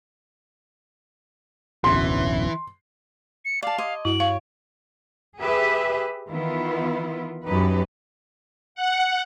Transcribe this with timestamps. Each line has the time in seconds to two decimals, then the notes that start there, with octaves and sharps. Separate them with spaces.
1.84 D1 B1 F#2 E3 C6
3.45 C#7
3.63 D5 F5 A5
3.78 D#5 C6 D6 G#6
4.05 G2 E4 F#4 D7 F#7
4.20 C#5 F5
5.41 G4 G#4 B4 E5
6.28 D#3 E3 B3 E4 F4
7.47 F#2 D#4 G4 B4
8.75 F#5